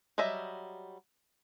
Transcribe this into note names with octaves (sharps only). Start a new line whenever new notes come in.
F#3 G3 D#5 E5